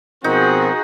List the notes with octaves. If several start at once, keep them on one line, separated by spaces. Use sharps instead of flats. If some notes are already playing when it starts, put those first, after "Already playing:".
B2 F3 C4 D#4 F#4 G#4 A#4